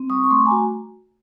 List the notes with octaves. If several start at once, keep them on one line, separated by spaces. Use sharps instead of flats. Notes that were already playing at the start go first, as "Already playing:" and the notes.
Already playing: C4
G3 C#6 D#6
C#6
A3 C6 D6
G#5 A#5
F#4